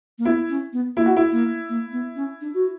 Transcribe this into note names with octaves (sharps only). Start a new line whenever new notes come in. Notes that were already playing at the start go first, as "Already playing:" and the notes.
A#3
B3 E4
C#4
B3
A#3 E4
F#4
E4
A#3
A#3
B3
C#4
D4
F#4